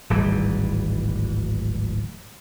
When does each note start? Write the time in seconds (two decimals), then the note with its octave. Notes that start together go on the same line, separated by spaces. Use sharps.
0.10 D1 G#1 E3 G3